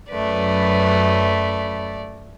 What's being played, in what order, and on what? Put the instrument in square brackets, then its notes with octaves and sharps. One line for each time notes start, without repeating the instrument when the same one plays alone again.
[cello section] F#2 B4 [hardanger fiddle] A3 D5